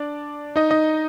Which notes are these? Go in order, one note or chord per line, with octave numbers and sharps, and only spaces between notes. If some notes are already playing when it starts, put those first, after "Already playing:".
Already playing: D4 D5
D#4 D#5
D#4 D#5